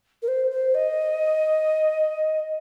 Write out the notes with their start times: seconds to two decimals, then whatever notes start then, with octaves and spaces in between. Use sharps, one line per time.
0.22 A#4
0.28 C5
0.51 C5
0.74 D#5